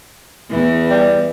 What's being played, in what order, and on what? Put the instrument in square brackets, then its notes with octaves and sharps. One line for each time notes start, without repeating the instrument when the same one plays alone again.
[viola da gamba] E2 E3
[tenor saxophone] G3